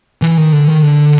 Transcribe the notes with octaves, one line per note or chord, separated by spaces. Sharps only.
E3
D#3
D3
D#3
D3